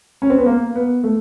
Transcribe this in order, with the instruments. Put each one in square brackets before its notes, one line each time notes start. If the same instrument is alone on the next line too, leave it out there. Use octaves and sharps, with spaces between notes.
[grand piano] C#4
C4
B3
A#3
B3
A3